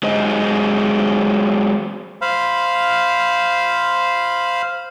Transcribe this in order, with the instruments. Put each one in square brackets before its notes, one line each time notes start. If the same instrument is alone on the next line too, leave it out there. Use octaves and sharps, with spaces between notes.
[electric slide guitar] F#3 G#3 G#4 C5 D#5
[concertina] C5 F5 B5